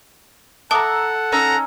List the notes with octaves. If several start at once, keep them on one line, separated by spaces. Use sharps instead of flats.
A4 E5 F#5 A5 A#5 D6 D#6
C#4 D#4 A#5 E6